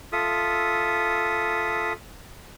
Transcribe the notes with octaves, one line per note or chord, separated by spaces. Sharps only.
F4 A4 E5 D#6